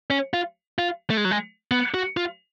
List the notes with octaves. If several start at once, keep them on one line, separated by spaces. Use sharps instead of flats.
C#4
F4
F4
A3
G#3
F#3
G#3
B3
F#4
F4